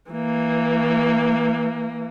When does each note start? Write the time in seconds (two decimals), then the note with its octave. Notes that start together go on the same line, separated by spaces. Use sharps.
0.11 E3 A#3